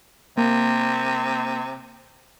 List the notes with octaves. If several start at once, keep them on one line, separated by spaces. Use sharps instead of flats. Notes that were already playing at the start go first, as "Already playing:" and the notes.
C3 A#3